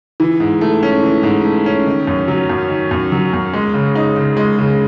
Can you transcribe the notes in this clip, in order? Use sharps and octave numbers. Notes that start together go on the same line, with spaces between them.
E3
G#2
A3
C#4
E3
G#2
A3
C#4
D#3
F#2
F#3
F#2
D#3
F#2
F#3
F#2
G#3
C#3
D#4
C#3
G#3
C#3